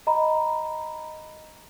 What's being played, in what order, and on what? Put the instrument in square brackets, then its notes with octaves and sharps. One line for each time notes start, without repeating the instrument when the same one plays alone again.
[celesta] D#5 A#5 B5